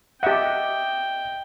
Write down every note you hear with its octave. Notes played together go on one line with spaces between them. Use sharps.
G4 D#5 E5 F#5 G5